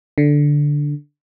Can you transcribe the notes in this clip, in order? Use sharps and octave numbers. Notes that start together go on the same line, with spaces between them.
D3